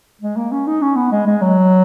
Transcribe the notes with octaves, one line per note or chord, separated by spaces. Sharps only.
G#3
A#3
C#4
D#4
C#4
B3
G#3
G#3
F#3